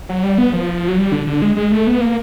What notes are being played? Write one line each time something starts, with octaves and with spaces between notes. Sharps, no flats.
F#3
G3
B3
F3
F#3
G3
D3
D3
G#3
G#3
A3
B3
A#3